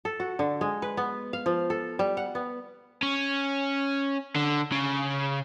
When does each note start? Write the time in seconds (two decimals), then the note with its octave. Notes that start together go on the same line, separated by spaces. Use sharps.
0.05 A4
0.20 F#4
0.39 D3
0.61 G#3
0.82 B4
0.97 B3
1.33 F5
1.46 F3
1.70 A4
1.99 G3
2.17 F#5
2.35 B3
3.03 C#4
4.36 D3
4.72 C#3